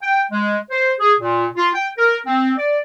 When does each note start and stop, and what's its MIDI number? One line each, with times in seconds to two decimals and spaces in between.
0.02 0.23 79
0.31 0.57 56
0.70 0.92 72
1.00 1.14 68
1.19 1.46 46
1.55 1.68 65
1.74 1.88 79
1.97 2.17 70
2.26 2.52 60
2.57 2.78 74